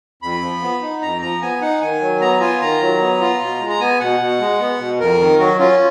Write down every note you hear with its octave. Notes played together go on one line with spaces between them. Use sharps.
F2 B5
F3
B3
D#4
F2 A#5
F3 A#5
B3 G#5
D#4 F#5
D#3 G#5
F#3
B3 A#5
F4 G#5
D#3 A#5
F#3
B3
F4
B2
G#3
A#5
B3 G#5
B2 F#5
B2
G#3
B3
B2
F2 A#4
D#3
F#3 F#4
C#4 F4